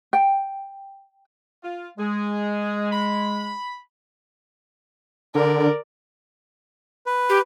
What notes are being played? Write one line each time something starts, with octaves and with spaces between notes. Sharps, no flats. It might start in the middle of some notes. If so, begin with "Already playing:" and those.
G5
F4
G#3 G#4
B5
D3 A#4 D5
B4
G4